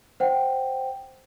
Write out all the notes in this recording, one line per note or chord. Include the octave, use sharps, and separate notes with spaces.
C5 F#5 G5